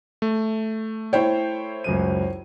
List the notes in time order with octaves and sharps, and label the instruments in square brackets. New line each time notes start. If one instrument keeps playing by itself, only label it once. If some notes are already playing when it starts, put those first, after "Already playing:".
[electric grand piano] A3
[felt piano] E4 C5 C#5 [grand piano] G5
[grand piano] C#2 F#2 D#7